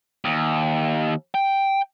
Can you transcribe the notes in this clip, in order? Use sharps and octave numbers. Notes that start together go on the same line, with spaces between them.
D#2
G5